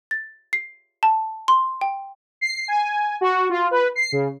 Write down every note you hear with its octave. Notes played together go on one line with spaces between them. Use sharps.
A6
C7
A5
C6
G5
C7
G#5
F#4
F4
B4
C7
C#3